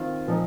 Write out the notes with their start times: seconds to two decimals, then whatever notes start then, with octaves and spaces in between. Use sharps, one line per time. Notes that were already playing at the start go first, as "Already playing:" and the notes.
Already playing: D#3 C4 F4
0.27 A#2 F3 D#4